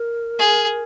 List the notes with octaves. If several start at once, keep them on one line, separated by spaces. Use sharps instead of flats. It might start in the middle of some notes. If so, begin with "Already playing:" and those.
Already playing: A#4
G#4